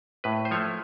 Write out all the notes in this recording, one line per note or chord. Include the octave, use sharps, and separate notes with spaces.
A2 B4
C5
F3 A3 C#5